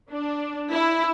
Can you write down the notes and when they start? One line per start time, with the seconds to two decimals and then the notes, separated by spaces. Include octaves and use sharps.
0.11 D4
0.71 E4